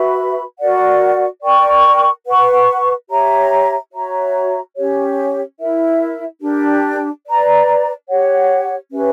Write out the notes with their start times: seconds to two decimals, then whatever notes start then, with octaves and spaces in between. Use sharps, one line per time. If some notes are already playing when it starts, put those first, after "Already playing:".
Already playing: F#4 B4 E5 B5
0.59 F#4 A#4 D5 F#5
1.42 A#4 D5 G5 C#6
2.26 B4 F#5 C#6
3.09 G4 C#5 E5 A#5
3.92 F#4 C#5 E5 A#5
4.75 C#4 G4 C#5
5.58 E4 A#4 E5
6.42 D4 G4 A#4
7.25 B4 D5 A#5
8.08 G4 C#5 F#5
8.91 C#4 G4 B4 E5